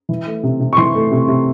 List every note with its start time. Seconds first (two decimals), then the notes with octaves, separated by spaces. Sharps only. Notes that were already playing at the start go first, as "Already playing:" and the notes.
0.09 E3
0.26 A3
0.43 C3
0.60 C3
0.73 C#6
0.77 E3 C6
0.95 A3
1.12 C3
1.28 C3